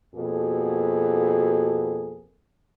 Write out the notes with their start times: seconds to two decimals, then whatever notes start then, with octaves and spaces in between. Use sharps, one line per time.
0.15 F2 B2 A#3 F#4 G#4 A4